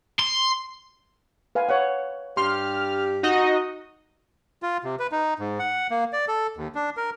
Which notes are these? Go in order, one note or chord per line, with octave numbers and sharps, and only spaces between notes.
C6
B4 F5 G#5
C#5 F#5
G2 G4 C6 F6
D#4 F#4 D#5
F4
C3
B4
D#4
G#2
F#5
A#3
D5
A4
D#2
D4
A#4